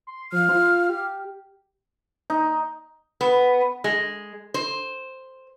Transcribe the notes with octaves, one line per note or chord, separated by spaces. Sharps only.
C6
F3 F6
F4
G4
D#4
B3
G#3
C5